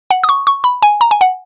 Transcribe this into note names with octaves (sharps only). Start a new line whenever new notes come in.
F#5
D#6
C#6
C#6
B5
G#5
A#5
G#5
F#5